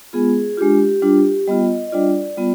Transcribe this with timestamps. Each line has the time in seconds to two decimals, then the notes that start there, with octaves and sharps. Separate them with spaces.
0.13 G#3 B3 F4 G#4
0.57 G#3 D4 F4 G4
1.02 G3 D4 F4
1.47 G3 B3 F4 D#5
1.87 D#5
1.92 G3 D4 F4 D5
2.37 G3 B3 F4